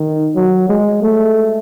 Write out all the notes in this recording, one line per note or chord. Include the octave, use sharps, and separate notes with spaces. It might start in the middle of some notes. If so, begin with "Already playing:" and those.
Already playing: D#3
F#3
G#3
A3